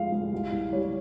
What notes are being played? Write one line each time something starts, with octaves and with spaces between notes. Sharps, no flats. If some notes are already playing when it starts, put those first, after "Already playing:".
Already playing: F2 G#3 F5
G#3
C2
C2
G3 C#5